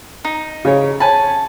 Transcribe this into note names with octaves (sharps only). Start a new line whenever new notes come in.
D#4
C#3 G#4 C#5
C#5 G#5 A5 B5